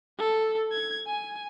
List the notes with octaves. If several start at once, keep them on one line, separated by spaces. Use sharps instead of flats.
A4
G#6
G#5